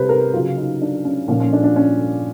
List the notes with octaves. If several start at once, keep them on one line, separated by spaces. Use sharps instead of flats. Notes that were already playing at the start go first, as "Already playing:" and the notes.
Already playing: C3 G3 B4 C5
A#4
C#3 F#3 F4
D#4
D4
C#4
A#2 F3 C#4
C#4
D4
D4
C#4